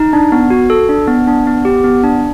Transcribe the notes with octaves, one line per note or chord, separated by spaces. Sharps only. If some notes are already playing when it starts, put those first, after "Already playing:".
Already playing: D#4
D4
B3
F#4
A4
D4
B3
D4
B3
G4
B3
D4